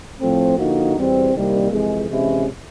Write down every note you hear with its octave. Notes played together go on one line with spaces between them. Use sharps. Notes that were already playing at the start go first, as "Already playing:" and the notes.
A2 F3 A3 C4
D3 F3 A#3 D#4 F#4
E2 B2 G3 C4
C2 C3 D#3 G3 A#3
F2 C3 E3 G#3
C3 E3 G#3 C#4 E4